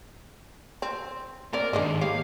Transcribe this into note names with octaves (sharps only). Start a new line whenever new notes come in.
C4
C4 C#4 A#4 D5
G#2 D#3 G#3 D4 D#5
A#3 G4 C#5 F5